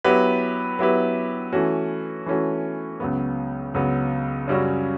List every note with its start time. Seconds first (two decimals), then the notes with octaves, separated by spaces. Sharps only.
0.04 F#3 B3 E4 G4 B4
0.79 F#3 B3 E4 G4 B4
1.53 E3 A3 C#4 F#4
2.26 E3 A3 C#4 F#4
3.00 C#2 C#3 F#3 B3
3.74 C#2 C#3 F#3 B3
4.48 F#2 C#3 G3 C#4 F#4